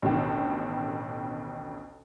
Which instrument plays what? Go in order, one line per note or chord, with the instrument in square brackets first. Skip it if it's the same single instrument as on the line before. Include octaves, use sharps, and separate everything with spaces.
[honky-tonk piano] A1 D2 B2 D#3